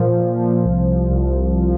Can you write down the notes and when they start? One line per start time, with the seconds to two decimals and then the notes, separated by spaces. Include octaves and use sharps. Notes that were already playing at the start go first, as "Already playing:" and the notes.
Already playing: A#2 F3
0.20 F3
0.65 C2
1.10 C2
1.55 F3